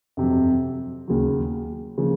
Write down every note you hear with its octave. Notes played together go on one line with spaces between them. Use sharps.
F2 C3 F#3
D#2 C#3 F#3
C#3 F3 A#3